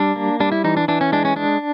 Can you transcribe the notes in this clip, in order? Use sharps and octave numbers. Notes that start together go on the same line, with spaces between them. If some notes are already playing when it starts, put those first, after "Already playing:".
Already playing: G3 D4
A#3
G3 D4
E4
E3 D#4
D4
E3 D4
C#4
G#3 D4
C#4
G#3 D4